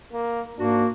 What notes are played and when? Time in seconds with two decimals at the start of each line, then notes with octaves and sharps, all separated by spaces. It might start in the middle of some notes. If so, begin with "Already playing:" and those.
0.13 A#3
0.58 G#2 A#3 D4 F#4